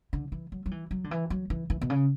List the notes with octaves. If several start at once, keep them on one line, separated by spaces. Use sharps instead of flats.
D3
E3
F#3
F#3
E3
F#3
D3
E3
F#3
E3
E3
B2
C#3